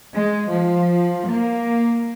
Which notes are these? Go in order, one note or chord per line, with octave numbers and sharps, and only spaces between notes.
G#3
F3
A#3